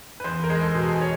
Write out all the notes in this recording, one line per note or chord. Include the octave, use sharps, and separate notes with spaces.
B4
E2 C5
A#4
G#3
A4
B2
G#4
C#5